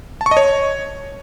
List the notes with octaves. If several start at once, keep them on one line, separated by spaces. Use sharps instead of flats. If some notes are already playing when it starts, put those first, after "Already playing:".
A5
C#6
D#5
C#5